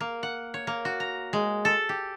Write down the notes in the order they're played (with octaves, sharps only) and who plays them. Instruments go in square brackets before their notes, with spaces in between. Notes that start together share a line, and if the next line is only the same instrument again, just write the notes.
[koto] A#3
F#5
C#5
A#3
F#4
A#5
G#3
A4
G4